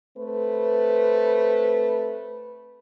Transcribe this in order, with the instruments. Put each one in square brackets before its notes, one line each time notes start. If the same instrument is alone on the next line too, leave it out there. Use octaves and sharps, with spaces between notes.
[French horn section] A3 C4 B4